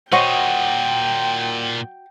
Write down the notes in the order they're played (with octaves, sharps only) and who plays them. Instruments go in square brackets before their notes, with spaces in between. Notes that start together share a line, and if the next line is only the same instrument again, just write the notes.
[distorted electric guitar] A#2 D#4 [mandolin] F#4 [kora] C5 C#5 D#5 [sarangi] G5